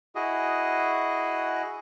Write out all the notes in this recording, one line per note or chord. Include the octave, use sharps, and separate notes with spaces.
E4 F#4 G#4 D#5